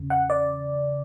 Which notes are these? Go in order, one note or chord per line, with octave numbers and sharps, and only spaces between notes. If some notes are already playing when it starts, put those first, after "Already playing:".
Already playing: E2 C#3
F#5
D5